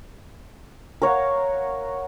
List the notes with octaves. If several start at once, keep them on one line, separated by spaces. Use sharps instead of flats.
A#4 C#5 F5 F#5